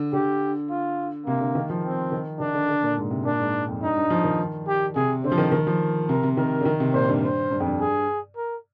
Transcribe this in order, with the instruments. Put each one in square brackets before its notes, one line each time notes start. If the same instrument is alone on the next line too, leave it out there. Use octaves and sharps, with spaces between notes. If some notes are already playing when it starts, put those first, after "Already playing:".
Already playing: [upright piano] D3
[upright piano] D3 [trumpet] G4
[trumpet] F4
[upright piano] C3 [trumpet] A#3
[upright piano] D3
D#3
F3
[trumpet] C4
[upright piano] D#3
[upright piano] D#3 [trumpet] D4
[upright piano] D3
D3
A#2
G#2
C3
[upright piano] A#2 [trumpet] D4
[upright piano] G#2
F2
[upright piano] G2 [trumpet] D#4
[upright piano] G2
F3
D#3
[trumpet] G4
[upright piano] C3 [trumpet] G#4
[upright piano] D3 [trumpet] C5
[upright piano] F3
D#3
D#3
F3
[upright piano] C3 [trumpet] A#4
[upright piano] C3
[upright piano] D#3 [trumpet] A#4
[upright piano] D3
D#3
C3
[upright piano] A#2 [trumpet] C5
[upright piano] G2
[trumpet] C5
[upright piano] G2
F2
G2
[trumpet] G#4
A#4